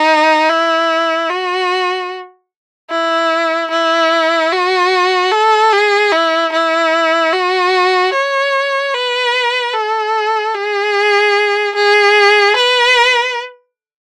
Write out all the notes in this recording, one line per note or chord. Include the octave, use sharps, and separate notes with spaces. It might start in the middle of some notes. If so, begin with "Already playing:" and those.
Already playing: D#4
E4
F#4
E4
E4
F#4
A4
G#4
E4
E4
F#4
C#5
B4
A4
G#4
G#4
B4